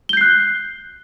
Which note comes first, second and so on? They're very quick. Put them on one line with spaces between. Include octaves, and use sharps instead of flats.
G7 G6 C7 F#6